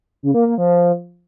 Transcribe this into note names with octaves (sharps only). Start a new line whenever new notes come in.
C#3
A#3
A#3
F3